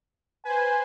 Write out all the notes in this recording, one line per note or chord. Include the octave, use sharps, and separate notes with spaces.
B4 C5 G#5